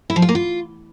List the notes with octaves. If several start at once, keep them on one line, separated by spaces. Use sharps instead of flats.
E4
F3
F4
A#3
F4